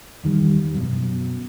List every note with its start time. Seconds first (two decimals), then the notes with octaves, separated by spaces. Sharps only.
0.23 E2 D#3 G3
0.74 F#2 B2